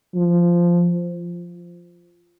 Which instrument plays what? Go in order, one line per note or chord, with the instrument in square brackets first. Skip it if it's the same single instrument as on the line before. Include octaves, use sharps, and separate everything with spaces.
[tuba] F3